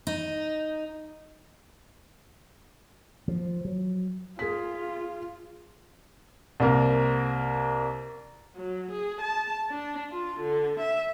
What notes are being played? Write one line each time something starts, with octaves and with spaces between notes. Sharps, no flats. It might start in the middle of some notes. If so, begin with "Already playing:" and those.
D#4
F3
F#3
F4 G#4 B6
C2 A#3 A#4
F#3
G#4
A5
D4
F4
D3
E5